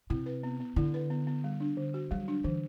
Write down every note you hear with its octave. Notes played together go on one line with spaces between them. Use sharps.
C3 E4
B4
B3
B3
D3 E4
B4
B3
B3
G3
D4
D3
F#4
F#3 G3
D4
D3 E3